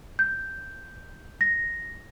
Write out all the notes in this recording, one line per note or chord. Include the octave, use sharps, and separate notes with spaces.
G6
A#6